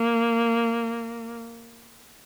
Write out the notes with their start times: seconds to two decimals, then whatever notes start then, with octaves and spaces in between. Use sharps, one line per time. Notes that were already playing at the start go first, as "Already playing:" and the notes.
Already playing: A#3